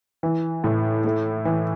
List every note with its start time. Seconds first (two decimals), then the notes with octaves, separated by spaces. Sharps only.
0.23 E3
0.64 A2
1.04 A3
1.45 E3